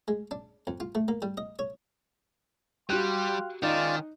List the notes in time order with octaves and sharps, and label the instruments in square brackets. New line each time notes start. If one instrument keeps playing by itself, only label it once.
[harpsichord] G#3
D4
F2
F4
A3
A#3
G3
D#5
C#5
[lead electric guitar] G3 [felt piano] F#4 G4 F#6 [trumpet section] F5 G5 C6
[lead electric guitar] D#3 [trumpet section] G#3 C#4 [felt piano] D#4 D#5 [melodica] F4 D5